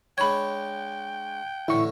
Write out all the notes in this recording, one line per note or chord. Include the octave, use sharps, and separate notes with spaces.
G#3 D4 C#5 G5 B5 G#6
A1 A2 D3 E4 C#6